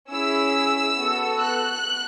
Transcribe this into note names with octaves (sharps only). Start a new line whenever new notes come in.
C#4 E4 G#4 E6
B3 F#4 A4
F#6